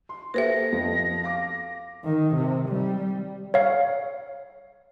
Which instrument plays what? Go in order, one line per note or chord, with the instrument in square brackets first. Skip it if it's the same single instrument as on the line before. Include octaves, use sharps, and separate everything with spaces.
[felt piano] C6
[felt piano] A#3 G4 A4 [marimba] B4 C5 E5 [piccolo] A#6
[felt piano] F2 F3
F5 D6
[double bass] D#3
C3
G3
[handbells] C#5 F5